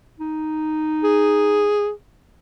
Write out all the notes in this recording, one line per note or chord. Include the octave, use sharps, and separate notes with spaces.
D#4
G#4